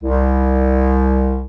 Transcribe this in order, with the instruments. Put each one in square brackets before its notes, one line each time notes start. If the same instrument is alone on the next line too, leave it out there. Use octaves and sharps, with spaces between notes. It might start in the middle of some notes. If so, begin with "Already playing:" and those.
[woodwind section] C2